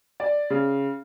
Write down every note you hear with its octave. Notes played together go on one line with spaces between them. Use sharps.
D5
C#3